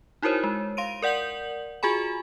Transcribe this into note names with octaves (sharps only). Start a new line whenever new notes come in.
D#4 E4 F#4 A#4 C5 C#5
G#3
F5 C6 D7 D#7
A#4 D5 F#5 G6 F#7
F4 F#4 G#4 G#5 B5